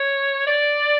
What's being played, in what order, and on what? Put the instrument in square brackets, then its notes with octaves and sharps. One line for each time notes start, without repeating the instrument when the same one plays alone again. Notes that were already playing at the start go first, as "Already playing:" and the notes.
Already playing: [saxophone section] C#5
D5